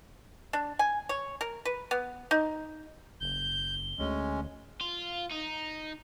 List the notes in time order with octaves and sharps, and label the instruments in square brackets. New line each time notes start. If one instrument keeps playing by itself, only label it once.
[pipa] D4
G#5
C#5
A#4
B4
B3
D#4
[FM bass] F#1 [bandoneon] G6 [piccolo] G7
[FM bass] D2 [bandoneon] G#3 C#4
[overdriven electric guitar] F4
D#4